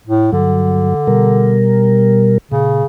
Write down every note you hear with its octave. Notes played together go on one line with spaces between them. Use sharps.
A2
G2 D3 F#3
B2 G3 A#4
A#2 C#3